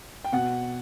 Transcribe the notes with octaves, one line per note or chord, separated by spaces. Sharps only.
G5
B2 F#5